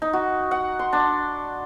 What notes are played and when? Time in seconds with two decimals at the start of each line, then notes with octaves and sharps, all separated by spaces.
0.02 D#4
0.13 F#4
0.51 F#5
0.79 C6
0.93 D4